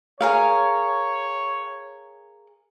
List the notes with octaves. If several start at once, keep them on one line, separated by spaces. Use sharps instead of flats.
G#4 A#4 C#5 F5